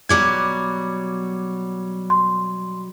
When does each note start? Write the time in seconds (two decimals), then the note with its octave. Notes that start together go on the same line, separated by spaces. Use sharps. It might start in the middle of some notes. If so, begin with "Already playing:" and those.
0.09 B2 F#3 G3 D6 G#6
2.10 C6